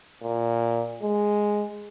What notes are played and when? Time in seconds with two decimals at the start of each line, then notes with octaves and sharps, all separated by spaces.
0.23 A#2
1.02 G#3